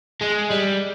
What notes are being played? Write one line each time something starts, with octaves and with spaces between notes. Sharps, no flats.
G#3
G3